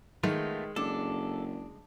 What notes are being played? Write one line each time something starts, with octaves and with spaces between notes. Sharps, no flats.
D#3 G#3 A3 B3 F4
F#1 D4 A4